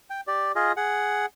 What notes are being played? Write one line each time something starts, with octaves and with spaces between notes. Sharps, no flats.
G5
G4 D5
F4 G#4 D#5
G#4 F#5